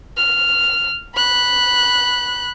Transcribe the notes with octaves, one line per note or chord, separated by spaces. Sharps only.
F6
B5 F#6